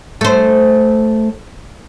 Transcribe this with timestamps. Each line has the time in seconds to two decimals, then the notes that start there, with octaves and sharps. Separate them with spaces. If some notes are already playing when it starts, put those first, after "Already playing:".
0.21 A3 C5